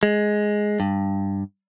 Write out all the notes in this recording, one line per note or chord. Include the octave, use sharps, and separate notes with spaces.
G#3
G2